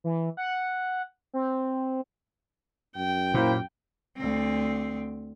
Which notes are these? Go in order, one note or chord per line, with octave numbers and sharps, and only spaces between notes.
E3
F#5
C4
F#2 G5
A#2 A#3 E4 C5
D2 C4